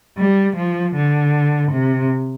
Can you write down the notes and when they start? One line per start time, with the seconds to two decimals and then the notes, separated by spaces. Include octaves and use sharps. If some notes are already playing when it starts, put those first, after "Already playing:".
0.18 G3
0.56 F3
0.95 D3
1.71 C3